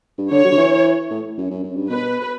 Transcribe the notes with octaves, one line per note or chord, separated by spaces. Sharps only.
G2
D3 C#5
F#3
D3
E3
A2
F#2
F#2
F#2
G2
B2 B4